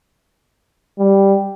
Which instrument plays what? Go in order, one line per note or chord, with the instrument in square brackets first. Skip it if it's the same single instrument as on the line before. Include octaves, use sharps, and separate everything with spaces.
[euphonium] G3